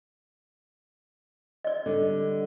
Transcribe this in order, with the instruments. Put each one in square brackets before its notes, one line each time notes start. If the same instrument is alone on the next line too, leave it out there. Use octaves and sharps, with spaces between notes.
[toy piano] D5 D#5
[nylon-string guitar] D3 G3